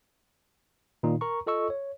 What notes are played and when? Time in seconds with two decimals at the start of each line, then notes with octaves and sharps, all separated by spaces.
1.03 A#2 D#3 D#4
1.21 A#4 A#5 C#6
1.47 F4 A4 D#5 C#6 E6
1.70 C#5